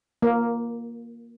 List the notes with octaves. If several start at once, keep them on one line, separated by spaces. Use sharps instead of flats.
A#3